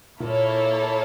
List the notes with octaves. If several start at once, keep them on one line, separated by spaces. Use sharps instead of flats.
A#2 A#3 E4 A4 C#5